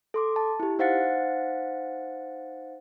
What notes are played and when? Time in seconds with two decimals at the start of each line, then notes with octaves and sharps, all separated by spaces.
0.14 A4 C6 D6
0.36 A5
0.60 E4 G4
0.79 D#4 C5 F5 F#5 A6 C#7